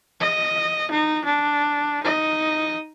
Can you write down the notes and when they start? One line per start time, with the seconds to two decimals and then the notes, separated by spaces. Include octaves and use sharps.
0.20 D#5
0.91 D#4
1.24 D4
2.03 D#4 D#5